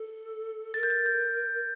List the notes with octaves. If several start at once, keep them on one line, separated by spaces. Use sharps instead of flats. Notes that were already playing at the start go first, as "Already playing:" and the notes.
Already playing: A4
A#4 A6
G6
A6
G6